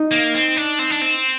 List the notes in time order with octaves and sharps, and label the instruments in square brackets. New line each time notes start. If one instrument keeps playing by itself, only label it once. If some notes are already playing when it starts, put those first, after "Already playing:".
Already playing: [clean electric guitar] D#4
[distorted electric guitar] A#3
C4
D4
C4
D4
C4